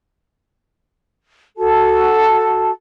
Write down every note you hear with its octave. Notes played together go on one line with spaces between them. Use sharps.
F#4 A4 A5